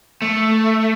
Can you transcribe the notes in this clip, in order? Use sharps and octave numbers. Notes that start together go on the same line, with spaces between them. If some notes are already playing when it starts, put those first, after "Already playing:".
A3